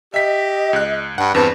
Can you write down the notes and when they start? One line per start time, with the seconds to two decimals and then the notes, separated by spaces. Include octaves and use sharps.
0.14 G4 D#5 E5 B6
0.73 C#2 F#6
1.18 G2 F#5
1.35 E2 G2 C4 B4 A5